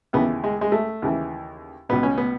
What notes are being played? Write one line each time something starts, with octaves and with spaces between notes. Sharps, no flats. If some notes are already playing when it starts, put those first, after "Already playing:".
D#2 C#3 E3 B3
G#3
G#3
A3
D#2 C#3 E3
C#2 B2 B3
C#4
B3